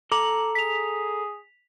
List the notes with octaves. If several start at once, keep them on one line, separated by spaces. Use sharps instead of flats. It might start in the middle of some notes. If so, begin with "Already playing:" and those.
A4 A#5 D6 F#7
G#4 B6 F7